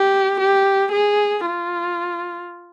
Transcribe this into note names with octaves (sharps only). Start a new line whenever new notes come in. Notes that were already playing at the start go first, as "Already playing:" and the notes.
Already playing: G4
G4
G#4
F4